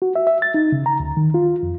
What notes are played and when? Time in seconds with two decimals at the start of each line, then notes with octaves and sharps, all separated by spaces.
0.02 F#4
0.16 E5
0.27 E5
0.42 A6
0.54 D#4
0.72 C#3
0.86 A#5
1.00 D2
1.17 D#3
1.34 F4
1.63 F2